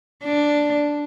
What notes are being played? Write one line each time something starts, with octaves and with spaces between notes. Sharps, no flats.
D4